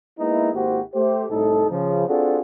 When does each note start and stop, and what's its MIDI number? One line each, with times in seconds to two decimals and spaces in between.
0.19 0.49 56
0.19 0.49 58
0.19 0.49 59
0.19 0.49 63
0.19 0.49 64
0.54 0.80 32
0.54 0.80 58
0.54 0.80 64
0.54 0.80 66
0.54 0.80 67
0.54 0.80 72
0.94 1.25 57
0.94 1.25 67
0.94 1.25 72
1.30 1.66 36
1.30 1.66 45
1.30 1.66 63
1.30 1.66 69
1.70 2.07 49
1.70 2.07 53
2.08 2.40 60
2.08 2.40 62
2.08 2.40 65
2.08 2.40 66
2.08 2.40 68
2.08 2.40 69